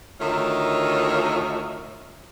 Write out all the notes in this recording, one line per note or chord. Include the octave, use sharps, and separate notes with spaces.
D2 D#3 D#4 F4 C#5 E5